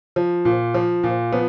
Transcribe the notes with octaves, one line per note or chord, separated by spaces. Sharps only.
F3
A#2
F3
A#2
F3 B3